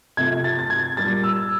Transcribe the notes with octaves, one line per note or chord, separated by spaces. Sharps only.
C3 F3 A3 G#6
A6
A6
G#6
A#2 G3 A#3 A6
E6